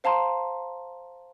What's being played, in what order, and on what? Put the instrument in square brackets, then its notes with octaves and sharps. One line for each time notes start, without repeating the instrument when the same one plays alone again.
[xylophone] C5 F5 A5 A#5 C6